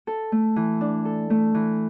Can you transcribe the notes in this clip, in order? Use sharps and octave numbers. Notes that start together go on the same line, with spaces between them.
A4
A3
E3
D4
A4
A3
E3